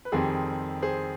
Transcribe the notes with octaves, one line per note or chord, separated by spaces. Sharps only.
B4
F2 D#3 G3 C4 G#4
G#4 C5